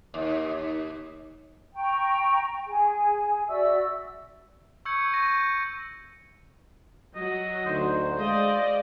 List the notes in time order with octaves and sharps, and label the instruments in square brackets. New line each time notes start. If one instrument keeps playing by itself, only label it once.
[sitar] D#2
[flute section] G5 A#5 C#6
G#4 G#5
F#4 D5 E5 E6
[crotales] C#6 E6 G6 G#6 C#7
C#6 G6 A#6 D#7
[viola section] F#3 F#4 [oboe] D#5
[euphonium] D2 [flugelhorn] D#4 [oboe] C5
[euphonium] G#3 [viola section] D5 D#5 [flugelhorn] F5